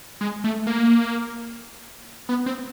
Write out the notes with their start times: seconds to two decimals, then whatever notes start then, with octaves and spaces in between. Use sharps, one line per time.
0.21 G#3
0.44 A3
0.67 A#3
2.29 B3
2.46 C4